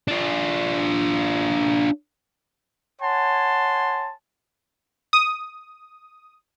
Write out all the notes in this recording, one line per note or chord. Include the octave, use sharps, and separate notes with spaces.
D4 F4
C#5 F#5 G#5 A5 C6
D#6